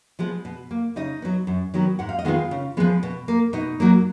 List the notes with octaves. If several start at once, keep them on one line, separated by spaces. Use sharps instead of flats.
F3 G#3 B3
B2
A#3
C#3 D#4 D#5
F#3 B3
F#2
D#3 F#3 B3
G#2 F#5
F5
D#5
D#3 G#3 B3 F4 F5
C#3
F3 G#3 B3
B2
A#3
B2 D#4 D#5
F#3 A#3